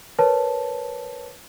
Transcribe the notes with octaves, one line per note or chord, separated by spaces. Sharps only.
A#4 B4 C#5 A5